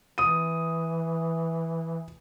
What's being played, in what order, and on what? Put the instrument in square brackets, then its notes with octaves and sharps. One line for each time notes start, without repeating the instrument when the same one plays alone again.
[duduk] E3 [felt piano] D#6 D#7